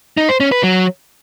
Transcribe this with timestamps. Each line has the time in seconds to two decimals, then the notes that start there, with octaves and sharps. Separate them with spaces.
0.17 D#4
0.29 C5
0.40 C#4
0.52 B4
0.63 F#3